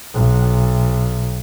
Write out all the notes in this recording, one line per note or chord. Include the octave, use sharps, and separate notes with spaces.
B1